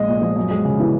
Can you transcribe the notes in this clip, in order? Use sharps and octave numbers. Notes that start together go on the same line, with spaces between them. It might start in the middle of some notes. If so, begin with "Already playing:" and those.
Already playing: A#1 G#3 D#5
A#2
F3
F#2
G#3
C#3
E3